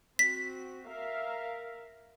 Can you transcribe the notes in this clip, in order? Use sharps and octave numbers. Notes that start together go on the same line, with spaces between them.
C4 F#4 B6
A#4 E5 F5